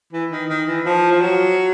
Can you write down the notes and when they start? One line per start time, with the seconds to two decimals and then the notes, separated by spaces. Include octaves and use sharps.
0.13 E3
0.31 D#3
0.49 D#3
0.67 E3
0.85 F3
1.11 F3
1.21 F#3